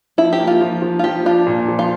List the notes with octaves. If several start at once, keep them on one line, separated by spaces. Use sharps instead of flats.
F3 E4
G4
A#3
F4
F3
F3
F4
F3 G4
D4 F4
A#2
F3
F4